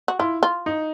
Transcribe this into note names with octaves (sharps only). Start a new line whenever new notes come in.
F#4
E4 F4
F4
D#4